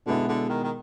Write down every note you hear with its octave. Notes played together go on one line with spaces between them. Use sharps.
B2 D3 G#3 B3 E4
D3
D#3
D#3